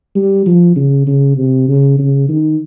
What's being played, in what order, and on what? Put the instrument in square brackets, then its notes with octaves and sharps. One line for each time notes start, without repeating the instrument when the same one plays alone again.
[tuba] G3
F3
C#3
C#3
C3
C#3
C#3
D#3